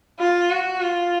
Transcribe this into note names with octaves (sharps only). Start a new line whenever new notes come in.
F4
F#4
F4